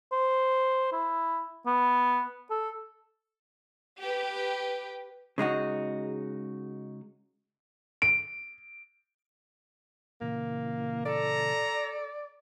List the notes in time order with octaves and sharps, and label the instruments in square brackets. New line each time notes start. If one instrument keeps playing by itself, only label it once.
[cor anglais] C5
E4
B3
A4
[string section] G4 B4
[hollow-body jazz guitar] C#3 G#3 D#4 F#4
[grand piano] D7
[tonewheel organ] A#2 C#3 E3 [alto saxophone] A#3
[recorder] A4 [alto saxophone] D5 [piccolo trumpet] A#5